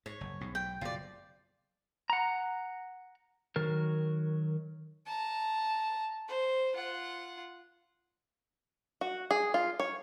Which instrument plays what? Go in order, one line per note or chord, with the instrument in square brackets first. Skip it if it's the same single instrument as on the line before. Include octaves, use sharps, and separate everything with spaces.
[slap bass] G#2 [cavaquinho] C#5
[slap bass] F#1
B1 G#2
[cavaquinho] G5
[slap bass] F#1 B2 [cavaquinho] F4 D5
[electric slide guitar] F#5 A#5
D#3 F#3 A#4
[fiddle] A5 A#5
C5
F4 F#5
[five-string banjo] F#4
G#4
F4
C#5